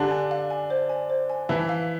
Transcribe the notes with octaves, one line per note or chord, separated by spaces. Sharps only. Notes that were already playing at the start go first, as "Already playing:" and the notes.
Already playing: D3 D4 G4
G#5
F5
G#5
C5
G#5
C5
G#5
E3 E4 A5
F5